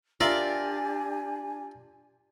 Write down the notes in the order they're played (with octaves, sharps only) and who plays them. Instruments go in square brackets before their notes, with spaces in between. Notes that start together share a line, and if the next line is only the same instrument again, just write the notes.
[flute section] D4 G4 G#5 [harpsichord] F4 A#4 E5 [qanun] D5